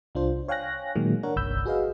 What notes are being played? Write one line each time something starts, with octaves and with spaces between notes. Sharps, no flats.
C2 D4 F4 C5
C#5 F5 G5 G#5 F#6 A#6
A#2 D#3 F#3 G#3 A#3
D4 A#4 C#5 F#5
G1 C2 B5 E6 G6
F#4 G#4 B4 D#5 F5